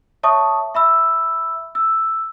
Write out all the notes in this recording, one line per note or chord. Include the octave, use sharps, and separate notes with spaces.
C#5 E5 A5 C#6 D#6
E5 B5 E6
E6